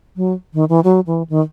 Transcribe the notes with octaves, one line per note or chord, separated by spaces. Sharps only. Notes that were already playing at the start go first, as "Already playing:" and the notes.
F#3
D#3
E3
F#3
E3
D#3